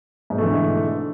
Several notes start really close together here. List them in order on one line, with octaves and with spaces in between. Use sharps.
G#2 B2 A3 E3 D3